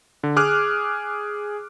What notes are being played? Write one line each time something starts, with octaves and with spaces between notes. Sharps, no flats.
D3
G#4 D6 F6 F#6